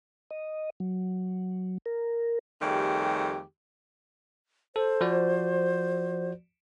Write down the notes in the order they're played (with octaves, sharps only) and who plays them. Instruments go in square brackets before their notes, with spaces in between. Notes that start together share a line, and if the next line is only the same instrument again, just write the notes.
[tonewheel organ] D#5
F#3
A#4
[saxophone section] F2 D#3 G3 A3 G4 G#4
[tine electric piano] A4 [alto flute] C5
[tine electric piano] F3 F#4 D5